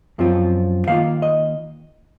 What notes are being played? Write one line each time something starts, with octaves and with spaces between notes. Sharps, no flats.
F#2 F3 C4 F4
D#3 A#3 F4 F5
D#5